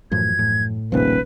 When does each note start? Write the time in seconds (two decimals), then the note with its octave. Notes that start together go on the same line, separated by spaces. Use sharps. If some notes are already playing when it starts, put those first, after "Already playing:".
0.12 F#2 A2 E3 F3 G#6
0.39 A2
0.92 D#1 A#1 C3 F3 B4